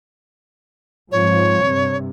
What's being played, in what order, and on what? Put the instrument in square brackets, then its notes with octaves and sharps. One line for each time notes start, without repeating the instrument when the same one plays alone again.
[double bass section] G#2 F3 C4 [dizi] C#5
[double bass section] G2 C3